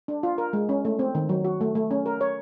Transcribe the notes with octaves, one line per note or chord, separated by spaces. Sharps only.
D4
F4
A#4
G#3
C#4
A3
C4
D#3
F#3
F#4
A3
A3
C#4
A#4
C#5